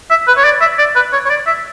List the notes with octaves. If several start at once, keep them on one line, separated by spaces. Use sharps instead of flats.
E5
B4
C#5
D5
E5
D5
B4
C#5
C#5
D5
E5